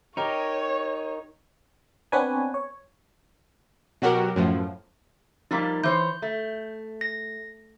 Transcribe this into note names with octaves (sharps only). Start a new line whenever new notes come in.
D#4 G4 A#4 C#5
B3 C4 D4 B4 C#5 G#5
C#5
B2 F#3 F#4 G4 A#4
F#2 A2 F3
F3 G3 A#3 D#4
E3 C5 C#5 G6
A3
A#6